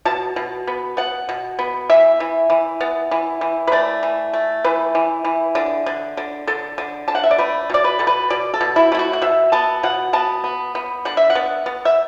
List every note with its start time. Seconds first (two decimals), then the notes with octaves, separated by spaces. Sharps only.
0.05 B2 A5
0.36 B2
0.67 B3
0.97 B3 F#5
1.29 B2
1.59 B3
1.89 E3 E5
2.20 E3
2.50 E3
2.81 B3
3.11 E3
3.41 E3
3.67 B4
3.72 A3 D5
4.03 E3
4.34 A3
4.64 E3 B4
4.95 E3
5.25 E3
5.55 D3
5.86 D3
6.17 D3
6.47 D3 A4
6.78 D3
7.08 D3 A5
7.15 F#5
7.24 E5
7.31 D5
7.38 A3 B4
7.70 B2 D5
7.84 B4
7.99 B2 A4
8.07 B4
8.30 B2 D5
8.54 A4
8.61 B2
8.76 E4
8.92 A3 E4
8.99 F#4
9.13 F#5
9.22 B2 E5
9.52 B3 A5
9.83 B2 F#5
10.13 B3 A5
10.44 B3
10.75 B3
11.05 D3 F#5
11.17 E5
11.30 F#5
11.35 B3
11.66 B3
11.85 E5